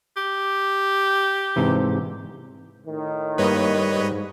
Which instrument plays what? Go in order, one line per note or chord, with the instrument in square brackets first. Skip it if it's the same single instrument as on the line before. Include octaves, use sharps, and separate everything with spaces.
[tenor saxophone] G4
[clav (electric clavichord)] G#2 C3 E3
[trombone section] A2 D#3
[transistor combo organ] G2 G3 [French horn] A#3 [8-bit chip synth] B4 C#5 D#5
[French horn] G#2